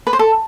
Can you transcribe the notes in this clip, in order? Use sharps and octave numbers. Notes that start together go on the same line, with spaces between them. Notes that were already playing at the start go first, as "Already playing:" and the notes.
B4
C5
A4